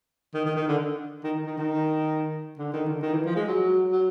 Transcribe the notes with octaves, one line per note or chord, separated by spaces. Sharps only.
D#3
D#3
D#3
D3
D#3
D#3
D#3
D3
D#3
D3
D#3
E3
F3
G#3
F#3
F#3